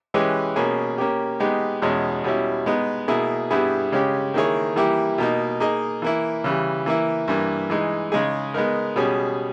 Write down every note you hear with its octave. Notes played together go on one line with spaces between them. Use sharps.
E3 G#3 C#4 G4 B4
B2 A#3 C#4 G#4
A#3 C#4 G4
G#3 B3 D#4 G4
E2 B2 G#3 C#4
B2 G3 C#4 E4
G#3 B3 D#4
B2 A#3 E4 G#4
G2 G3 B3 E4 G#4
C#3 G#3 C#4 G4
D#3 A#3 E4 G#4 C#5
E3 G3 A#3 E4 G4
B2 A#3 D#4
A#3 D#4 G#4 D#5
E3 A#3 E4
C#3 E3 G3
E3 A#3 E4
G2 E3 A#3
E3 G#3 D#4
C#3 G#3 D#4 G#4
G#3 B3 D#4 A#4
B2 G3 C#4 G#4